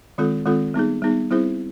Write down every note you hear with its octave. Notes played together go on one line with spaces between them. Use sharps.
D#3 G#3 C4 F4 A4
D#3 G#3 C4 F4 A4
G3 B3 D#4 G#4
G3 B3 D#4 G#4
G3 C4 E4 G#4 C5